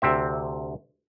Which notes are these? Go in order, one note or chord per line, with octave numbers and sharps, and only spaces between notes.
D2 C3 C4 E5